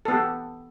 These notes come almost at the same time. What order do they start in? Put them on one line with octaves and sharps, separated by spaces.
A4 B3 G4